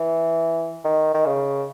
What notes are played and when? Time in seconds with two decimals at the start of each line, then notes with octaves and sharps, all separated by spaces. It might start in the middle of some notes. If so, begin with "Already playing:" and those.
Already playing: E3
0.84 D#3
1.14 D#3
1.26 C#3